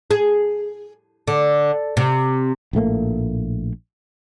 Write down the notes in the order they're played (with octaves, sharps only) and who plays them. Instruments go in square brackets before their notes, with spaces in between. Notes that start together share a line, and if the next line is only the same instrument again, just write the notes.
[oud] G#4
D3
C3
[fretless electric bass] A#1 A2 A3 A#3